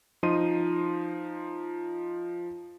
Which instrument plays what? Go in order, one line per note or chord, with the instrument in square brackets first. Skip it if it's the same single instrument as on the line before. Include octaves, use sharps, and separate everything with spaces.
[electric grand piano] F3 D#4 D#5 C6 D#7